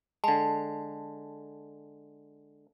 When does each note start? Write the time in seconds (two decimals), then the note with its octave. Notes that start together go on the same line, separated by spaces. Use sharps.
0.24 D3 G#3 A5